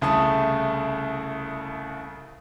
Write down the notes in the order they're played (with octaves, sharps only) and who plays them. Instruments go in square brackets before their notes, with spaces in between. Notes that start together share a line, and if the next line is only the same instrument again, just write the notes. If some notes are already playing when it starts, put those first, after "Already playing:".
[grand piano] C2 C#3 A3 A5 D#6